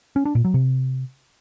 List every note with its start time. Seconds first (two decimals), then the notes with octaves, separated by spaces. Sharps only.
0.16 C#4
0.25 D4
0.35 A#2
0.45 F#3
0.54 C3